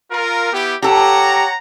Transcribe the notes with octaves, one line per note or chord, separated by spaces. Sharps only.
F4 A#4
B3 E4 G4
G4 A4 C#5 F#5 A#5